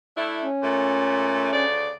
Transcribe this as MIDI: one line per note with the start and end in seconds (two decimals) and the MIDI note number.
0.17 0.46 57
0.17 0.46 62
0.17 0.46 64
0.43 1.64 61
0.63 1.51 46
0.63 1.51 49
0.63 1.51 57
1.53 1.92 38
1.53 1.92 49
1.53 1.92 74